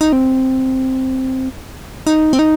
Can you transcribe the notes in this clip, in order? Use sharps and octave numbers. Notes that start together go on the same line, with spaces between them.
D#4
C4
D#4
C4
D#4